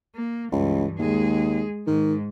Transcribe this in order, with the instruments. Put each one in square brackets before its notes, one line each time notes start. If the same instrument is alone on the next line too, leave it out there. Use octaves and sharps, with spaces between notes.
[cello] A#3
[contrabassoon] C#2 [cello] G2 E3
[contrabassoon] D#2 [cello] G#3 G#4
[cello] G#2 [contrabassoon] D#3